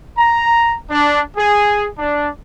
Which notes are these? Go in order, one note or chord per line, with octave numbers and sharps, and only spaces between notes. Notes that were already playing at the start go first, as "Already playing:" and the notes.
A#5
D4
G#4
D4